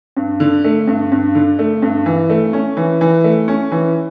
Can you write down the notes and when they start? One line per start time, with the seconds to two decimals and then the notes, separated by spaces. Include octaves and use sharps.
0.17 G2
0.40 D3
0.64 A3
0.87 G2
1.12 G2
1.35 D3
1.59 A3
1.82 G2
2.06 E3
2.30 A3
2.53 C#4
2.77 E3
3.01 E3
3.24 A3
3.48 C#4
3.72 E3